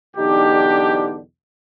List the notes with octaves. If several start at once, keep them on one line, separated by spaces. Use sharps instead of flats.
B1 E2 D3 D4 D#4 G4